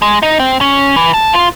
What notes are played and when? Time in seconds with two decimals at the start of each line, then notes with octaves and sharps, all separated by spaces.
0.02 G#3
0.23 D#4
0.40 C4
0.61 C#4
0.96 E3
1.14 A5
1.33 F4